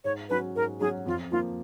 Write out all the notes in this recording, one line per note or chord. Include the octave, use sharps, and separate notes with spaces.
G#2 C#5
F#3 C#4 F#4 B4
G#2 A#4
F#3 C#4 F#4 G#4
F2 F4
F3 A#3 F4